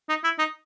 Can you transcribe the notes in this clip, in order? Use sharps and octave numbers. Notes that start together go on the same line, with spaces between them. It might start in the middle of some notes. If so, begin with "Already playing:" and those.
D#4
E4
D#4